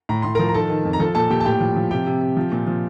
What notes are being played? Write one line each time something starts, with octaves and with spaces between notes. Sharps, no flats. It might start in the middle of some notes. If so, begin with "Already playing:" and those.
A2 A#5
A2 C6
F3 A#4 A#5
A#5
D#3 A4 A5
D#3
F2
A#5
F3 A4 A5
A#2 A4 A5
A#2 G4 G5
A5
A2 G4 G5
F3
F3
C3 G4 G5
C3
C3
F3
A#2
F3